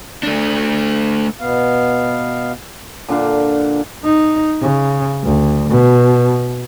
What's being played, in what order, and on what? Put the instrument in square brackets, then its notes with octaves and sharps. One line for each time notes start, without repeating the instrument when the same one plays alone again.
[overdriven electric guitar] A3 D4
[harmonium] B2 B3 F5
[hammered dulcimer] A#2 D3 D4 F5
[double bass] D#4
C#3
D2
B2